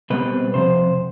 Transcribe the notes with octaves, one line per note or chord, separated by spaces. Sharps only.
B2 G3 C4 B4
F2 C3 C5